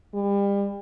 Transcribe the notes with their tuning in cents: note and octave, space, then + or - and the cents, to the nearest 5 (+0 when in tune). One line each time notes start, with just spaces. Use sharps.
G3 +35